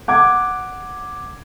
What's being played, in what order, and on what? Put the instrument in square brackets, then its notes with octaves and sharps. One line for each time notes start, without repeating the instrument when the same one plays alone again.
[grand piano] F#5 D6 G#6